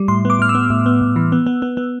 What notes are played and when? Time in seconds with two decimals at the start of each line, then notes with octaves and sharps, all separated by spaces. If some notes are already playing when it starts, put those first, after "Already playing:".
Already playing: G3
0.08 A2 C6
0.25 B3 D6
0.39 A2 F6
0.49 E6
0.55 B3
0.70 A2
0.86 B3
1.01 A2
1.16 E3
1.32 B3
1.46 B3
1.62 B3
1.77 B3